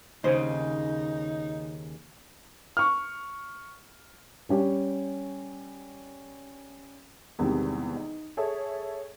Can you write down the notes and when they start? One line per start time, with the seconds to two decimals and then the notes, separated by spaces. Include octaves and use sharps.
0.24 D#2 A#2 C#3 D#4 G#4 C5
2.77 C#6 F6
4.49 G3 C#4 G4
7.39 E2 G#2 C3 D#3 G3 C4
7.96 D#4
8.37 G#4 A4 C#5 E5